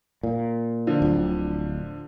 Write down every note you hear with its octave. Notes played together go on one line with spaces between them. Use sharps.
A#2
D3 F3
D1